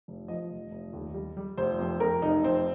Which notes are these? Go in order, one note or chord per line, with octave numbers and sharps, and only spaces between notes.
F1
F3 D#5
F1
F1
D#2
G3
G3
F1 C5
F2
F2 A#4
F1 D#4
F2 C4